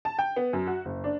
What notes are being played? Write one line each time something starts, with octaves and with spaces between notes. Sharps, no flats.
A5
G5
B3
F#2
F#4
F#1
D4